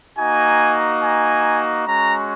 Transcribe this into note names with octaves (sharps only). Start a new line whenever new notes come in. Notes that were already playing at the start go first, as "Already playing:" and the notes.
A#3 D#4 F#4 G#5
G#5
G#3 C#4 F#4 A#5